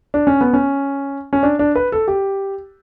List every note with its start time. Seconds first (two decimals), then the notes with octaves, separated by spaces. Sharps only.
0.14 D4
0.27 C#4
0.41 B3
0.53 C#4
1.33 C#4
1.43 D4
1.59 D4
1.75 B4
1.92 A4
2.08 G4